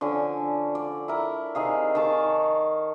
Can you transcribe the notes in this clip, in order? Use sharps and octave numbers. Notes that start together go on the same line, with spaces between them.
D3 F3 C#4 G#5
D5
E4 A#4
C3 D#3 G#4 F5
D#3 C#5 A5 D6